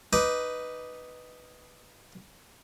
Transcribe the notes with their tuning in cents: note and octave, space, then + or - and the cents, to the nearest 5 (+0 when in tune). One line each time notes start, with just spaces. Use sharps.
D#4 +0 B4 +0 D6 +0